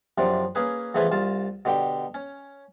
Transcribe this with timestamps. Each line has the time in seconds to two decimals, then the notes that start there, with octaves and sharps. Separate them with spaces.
0.18 F#2 C3 F3 D4
0.55 A#3 C#4 G#4 B4
0.95 E2 C#3 F3 A3 B4 G#5
1.12 C2 F4 A5
1.65 B2 D3 G4 G5
2.14 C#4